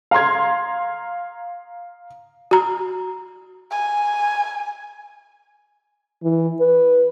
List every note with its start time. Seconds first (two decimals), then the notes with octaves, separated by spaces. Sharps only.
0.11 F5 A#5 C6 G#6
2.51 F#4 A#5
3.71 G#5
6.23 E3
6.61 B4